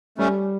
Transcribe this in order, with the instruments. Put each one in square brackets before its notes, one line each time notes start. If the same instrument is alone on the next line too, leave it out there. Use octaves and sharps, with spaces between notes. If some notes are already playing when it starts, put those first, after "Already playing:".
[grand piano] G3 [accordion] A3 C#4